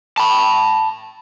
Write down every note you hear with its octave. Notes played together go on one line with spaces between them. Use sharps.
A5 B5